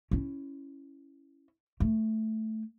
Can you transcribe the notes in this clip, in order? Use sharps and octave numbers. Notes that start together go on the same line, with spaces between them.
C#4 E4
A3